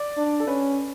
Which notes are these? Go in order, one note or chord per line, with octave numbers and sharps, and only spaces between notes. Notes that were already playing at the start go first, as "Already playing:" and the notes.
Already playing: D5
D4
A4
C#4 B4